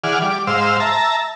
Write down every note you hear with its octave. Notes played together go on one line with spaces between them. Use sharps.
E3 G#4 D5 F#5 F6
G3 D6
G#2 C5 F5 E6
E5 A5 A#5